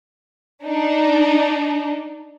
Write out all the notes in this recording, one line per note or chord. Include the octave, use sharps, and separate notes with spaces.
D4 D#4